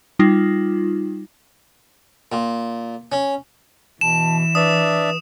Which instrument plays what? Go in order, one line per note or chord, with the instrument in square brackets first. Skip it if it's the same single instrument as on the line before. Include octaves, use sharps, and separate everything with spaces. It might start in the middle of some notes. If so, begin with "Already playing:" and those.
[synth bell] G3 D#4 F4
[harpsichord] A#2
C#4
[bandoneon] B2 [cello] E3 [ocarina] A5 [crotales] E7
[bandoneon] D4 D5 E5 [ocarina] B4 [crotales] D#6